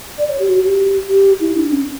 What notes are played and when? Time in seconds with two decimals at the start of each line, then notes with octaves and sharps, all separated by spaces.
0.18 D5
0.29 C#5
0.39 G4
0.48 F#4
0.64 G4
1.10 G4
1.40 E4
1.56 D4
1.71 C#4